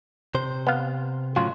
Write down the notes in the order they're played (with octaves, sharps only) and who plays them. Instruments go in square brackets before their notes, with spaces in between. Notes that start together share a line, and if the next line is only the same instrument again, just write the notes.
[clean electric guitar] C3 C5
[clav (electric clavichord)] B3 F5
[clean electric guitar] A2 C#3 F#3 [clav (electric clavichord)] F4